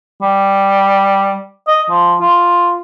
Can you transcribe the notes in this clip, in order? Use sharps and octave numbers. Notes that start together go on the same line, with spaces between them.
G3
D#5
F3
F4